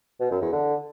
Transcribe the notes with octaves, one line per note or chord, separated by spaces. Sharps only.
B2
F#2
E2
D3